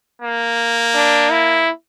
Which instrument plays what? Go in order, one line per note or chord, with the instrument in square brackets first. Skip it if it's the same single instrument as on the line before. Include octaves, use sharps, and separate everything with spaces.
[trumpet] A#3
[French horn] D4
E4